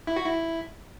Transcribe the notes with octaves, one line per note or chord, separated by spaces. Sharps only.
E4
F#4
E4